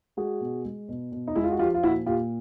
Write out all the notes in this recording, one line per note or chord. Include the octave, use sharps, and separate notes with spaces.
G#3 F#4 G#4
B2
G#3
B2
B2
D#4
G#3 E4
F4
F#4
F3 F4 G4
F4
A#2 E4 F#4
A#2 F4 G4